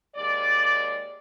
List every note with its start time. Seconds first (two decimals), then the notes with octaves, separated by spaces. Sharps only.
0.16 D#2 G#3 D5